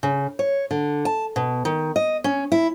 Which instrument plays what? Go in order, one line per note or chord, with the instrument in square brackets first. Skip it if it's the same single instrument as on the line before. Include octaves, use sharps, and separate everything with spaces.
[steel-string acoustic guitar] C#3
C#5
D3
A5
B2
D#3
D#5
C#4
E4